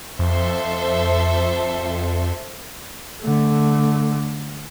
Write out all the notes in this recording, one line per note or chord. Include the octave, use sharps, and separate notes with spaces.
F2 A4 C5 E5
D3 A3